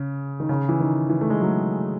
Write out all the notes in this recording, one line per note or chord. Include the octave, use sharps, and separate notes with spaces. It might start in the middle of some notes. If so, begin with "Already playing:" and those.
Already playing: C#3
D#3
C#3
E3
D#3
E3
A3
G#3
F#3